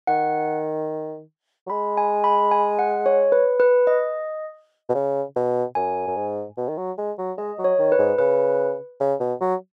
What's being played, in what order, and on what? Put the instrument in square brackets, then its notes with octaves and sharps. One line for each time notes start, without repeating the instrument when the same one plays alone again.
[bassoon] D#3 [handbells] F#5
[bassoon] F#3
[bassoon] G#3 [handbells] B5
[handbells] G#5
B5
G#5
F#5
C#5
B4
B4
D#5
[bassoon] B2
C#3
B2
[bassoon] F#2 [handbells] G#5
[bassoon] F#2
G#2
B2
D#3
F#3
G#3
F#3
[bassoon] G#3 [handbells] D#5
[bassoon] F#3
[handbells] C#5
[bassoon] D#3
[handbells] B4
[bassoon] G#2
[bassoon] C#3 [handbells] B4
[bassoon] C#3
B2
F#3